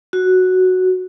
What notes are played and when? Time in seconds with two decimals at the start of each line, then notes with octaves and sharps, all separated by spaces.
0.13 F#4